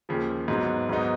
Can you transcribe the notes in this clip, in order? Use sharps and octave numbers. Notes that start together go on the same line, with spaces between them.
D#2 C#3 F3
G#2 F#3 B3
G#2 F#3 B3 D#4